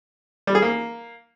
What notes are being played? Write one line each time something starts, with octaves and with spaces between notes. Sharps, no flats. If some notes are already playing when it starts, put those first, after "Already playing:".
G3
G#4
A#3